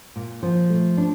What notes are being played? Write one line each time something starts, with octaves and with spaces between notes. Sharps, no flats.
A#2
F3
A3
D4